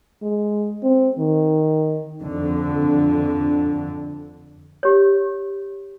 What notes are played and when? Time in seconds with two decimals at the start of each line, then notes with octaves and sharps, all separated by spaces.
0.22 G#3
0.83 C4
1.18 D#3
2.22 F2 D3
4.83 G4 C#5